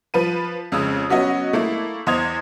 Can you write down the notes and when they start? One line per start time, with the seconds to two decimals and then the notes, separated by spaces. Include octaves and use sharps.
0.14 F3 B4 D#7
0.72 F2 C#3 G#3 D#6 E6
1.10 F#3 B3 C#4 F#4 D#5
1.53 A3 A#3 E4
2.07 E2 C5 D#5 D#6 G#6 F7